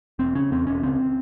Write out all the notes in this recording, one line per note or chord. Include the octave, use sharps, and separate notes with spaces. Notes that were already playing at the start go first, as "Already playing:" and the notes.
E1 C4
C#3 C#4
E2 C4
E1 C#4
C#2 C4